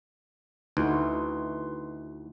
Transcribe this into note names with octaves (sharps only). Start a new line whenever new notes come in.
D2 D#4 E4 F#4 B4 C6